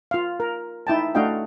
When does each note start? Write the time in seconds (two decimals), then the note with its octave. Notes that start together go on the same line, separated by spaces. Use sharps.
0.11 F4 F5
0.40 A#4
0.87 D#4 E4 G5 A5
1.15 A3 D4 F#4 D#5 F5 G5